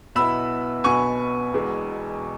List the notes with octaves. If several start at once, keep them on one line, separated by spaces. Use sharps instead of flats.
B1 B2 B3 E4 B5 E6
B1 B2 B3 F#4 G#5 C#6
E1 E2 B2 G#3